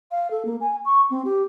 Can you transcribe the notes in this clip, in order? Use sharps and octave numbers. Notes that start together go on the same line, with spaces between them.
F5
A4
A#3
G#5
C#6
C4
G4